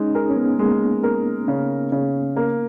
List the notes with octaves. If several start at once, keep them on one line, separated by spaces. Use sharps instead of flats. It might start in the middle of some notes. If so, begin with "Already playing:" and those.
Already playing: G#3 C#4 D#4
G#4 A#4
C#4
B3
G#3 A#3
A#4
C#3
C#3
A#3